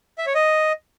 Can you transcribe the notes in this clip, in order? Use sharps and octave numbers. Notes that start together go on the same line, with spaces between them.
E5
C#5
D#5